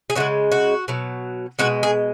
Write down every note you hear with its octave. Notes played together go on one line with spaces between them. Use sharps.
G#4
C#3 E3 G#3 F#4
F#4
B2 F#3
B2 G#3 F#4
G#4